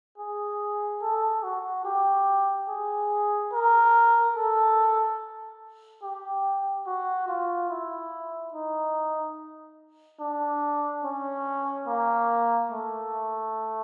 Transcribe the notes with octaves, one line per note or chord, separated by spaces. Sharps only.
G#4
A4
F#4
G4
G#4
A#4
A4
G4
F#4
F4
E4
D#4
D4
C#4
A#3
A3